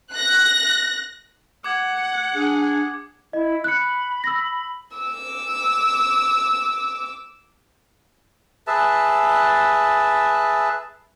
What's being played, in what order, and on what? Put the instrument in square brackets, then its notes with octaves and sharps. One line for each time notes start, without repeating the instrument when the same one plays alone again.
[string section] F#6 A#6
[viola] F#5 [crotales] D6 G#6
[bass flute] D4 [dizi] G#4
[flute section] E4 [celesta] D#5
[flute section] B5 [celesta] F#6 C#7
[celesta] E6 A#6
[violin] D6 E6
[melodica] G#4 B4 E5 A5